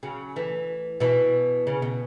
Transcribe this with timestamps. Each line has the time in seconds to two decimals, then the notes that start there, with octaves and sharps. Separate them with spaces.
0.03 C#3 F#3
0.36 E3 A3
1.00 B2 E3
1.67 C#3
1.82 B2